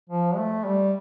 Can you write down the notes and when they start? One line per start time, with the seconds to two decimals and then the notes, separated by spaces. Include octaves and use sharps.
0.09 F3
0.37 A3
0.66 G3